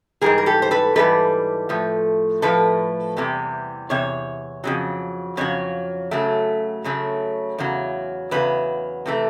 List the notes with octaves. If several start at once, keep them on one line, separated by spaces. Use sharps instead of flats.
G#2 E3 G3 G#4 A#4
A#4
G4 A4
C5
A4 B4
G#2 E3 G3 A4 B4
A2 F3 A3
A2 F3 A3 A4 B4
E2 C3 E3 G3
E2 C3 C#5
F2 C#3 F#3
F2 C#3 F#3 C#5
F#2 C#3 F#3 A3
F#2 C#3 F#3 A3
E2 C#3 F#3
E2 C#3 F#3 B4
C3 E3 A3